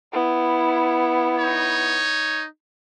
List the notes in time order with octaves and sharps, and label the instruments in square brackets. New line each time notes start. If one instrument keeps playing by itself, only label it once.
[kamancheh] B3 E4
[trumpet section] D#4 C#5